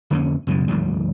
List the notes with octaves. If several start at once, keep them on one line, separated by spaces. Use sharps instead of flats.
F2 D3 A#3 C#4
C#2 F#2 B2 E3
D2 G#2 F3 G3